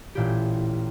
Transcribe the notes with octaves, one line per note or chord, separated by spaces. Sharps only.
A1 A#2 G4